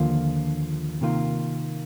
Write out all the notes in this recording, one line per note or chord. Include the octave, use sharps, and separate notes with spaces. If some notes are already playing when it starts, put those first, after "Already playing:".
Already playing: D#2 D3 F3 A#3 F4
C3 D#3 A#3 F4